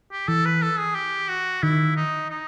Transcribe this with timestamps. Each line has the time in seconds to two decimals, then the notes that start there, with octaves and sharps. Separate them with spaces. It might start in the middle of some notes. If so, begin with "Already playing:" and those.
0.12 G4
0.28 E3 A4
0.45 B4
0.62 A4
0.79 G#4
0.95 G4
1.29 F#4
1.62 D#3 E4
1.96 D#4
2.30 D#4